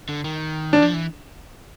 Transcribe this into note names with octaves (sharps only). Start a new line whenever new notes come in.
D3
D#3
D4
F3
E3